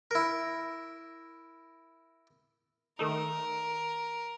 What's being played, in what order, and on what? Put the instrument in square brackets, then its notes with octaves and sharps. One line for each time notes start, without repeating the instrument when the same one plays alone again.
[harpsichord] E4 A#4
[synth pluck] D#3 A3 D#4 [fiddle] A#4